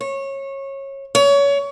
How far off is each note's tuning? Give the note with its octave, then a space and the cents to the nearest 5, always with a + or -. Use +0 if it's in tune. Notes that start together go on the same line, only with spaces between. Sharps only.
C#5 -20
C#5 +25